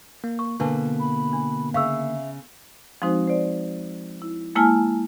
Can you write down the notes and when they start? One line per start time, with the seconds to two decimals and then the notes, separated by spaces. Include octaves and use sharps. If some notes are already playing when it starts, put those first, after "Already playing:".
0.24 A#3
0.39 C#6
0.60 B2 D3 A#3 D4 B4 A5
1.00 B5
1.33 D4
1.74 C#3 E5 F5 C#6 E6
3.02 F3 G#3 C4 D#4 F#4 C5
3.27 C5 D5
4.22 E4
4.55 G#3 A#3 E4 G#5 A5 F6